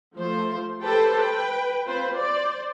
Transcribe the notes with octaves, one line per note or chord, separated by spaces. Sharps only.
F3 A3 F4 C5
G4 A4 B4 C5 G5 A5
B4 G5
C4 F4 B4 C5
C5 D5